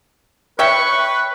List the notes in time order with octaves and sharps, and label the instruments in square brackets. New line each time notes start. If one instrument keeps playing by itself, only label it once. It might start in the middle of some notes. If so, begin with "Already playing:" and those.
[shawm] B4 [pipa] C#5 E5 G5 [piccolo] C#6